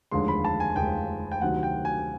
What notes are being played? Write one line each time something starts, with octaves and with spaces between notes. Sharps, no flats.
F1 D#2 D3 F3 G#3 C6
B5
A5
G#5
F1 D#2 D3 F3 G#3 G5
G5
D2 C3 D#3 F#3 F#5
G5
G#5